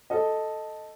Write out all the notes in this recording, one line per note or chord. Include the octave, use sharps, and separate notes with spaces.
A4 D#5